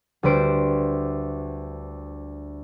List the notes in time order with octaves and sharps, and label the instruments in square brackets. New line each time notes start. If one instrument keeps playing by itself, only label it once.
[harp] D2 G3 B4 C5 D7